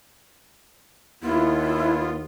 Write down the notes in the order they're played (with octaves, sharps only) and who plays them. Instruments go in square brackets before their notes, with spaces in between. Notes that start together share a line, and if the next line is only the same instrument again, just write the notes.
[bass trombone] D#2 [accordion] B3 F4 [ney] E4